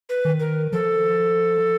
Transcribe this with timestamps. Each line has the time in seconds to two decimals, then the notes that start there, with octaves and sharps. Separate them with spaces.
0.09 B4
0.25 D#3
0.40 A#4
0.72 F3 A4